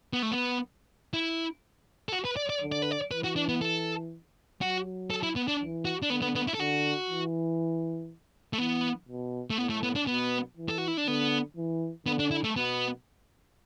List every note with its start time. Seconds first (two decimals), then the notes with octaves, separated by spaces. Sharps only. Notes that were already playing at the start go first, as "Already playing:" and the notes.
0.13 B3
0.23 A3
0.31 B3
1.13 E4
2.09 A4
2.12 F#4
2.25 B4
2.37 D5
2.50 D5
2.62 D3
2.72 D5
2.82 B4
2.91 D5
3.11 E3 B4
3.24 F#4
3.36 D4
3.49 B3
3.61 A4
4.60 F#3 F#4
5.10 A4
5.23 E4
5.36 B3
5.48 D4
5.61 E3
5.85 F#4
6.02 D4
6.10 D3 B3
6.22 B3
6.35 B3
6.48 E4
6.54 A4
6.59 D3 F#4
7.09 E3
8.53 A3
8.58 E3 B3
9.08 B2
9.50 A3
9.58 A2 B3
9.70 A3
9.83 B3
9.95 D4
10.07 B2 B3
10.57 E3
10.68 A4
10.78 F#4
10.88 E4
10.97 D4
11.07 D3 B3
11.57 E3
12.06 D3 B3
12.19 D4
12.31 E4
12.44 A3
12.56 B2 B3